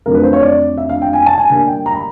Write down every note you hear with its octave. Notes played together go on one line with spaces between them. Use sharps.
F2 D3 F#3 A3 A#4
B4
C5
C#5
D5
E5
F5
G5
G#5
A5
G#5
D3 G3 A#3 D4 G#5
G5
A#5
B5